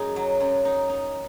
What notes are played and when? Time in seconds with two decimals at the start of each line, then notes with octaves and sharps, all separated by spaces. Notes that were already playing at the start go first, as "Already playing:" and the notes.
Already playing: F#2 D#4 G#4
0.16 F#3
0.40 F#2
0.65 D#4
0.89 D#4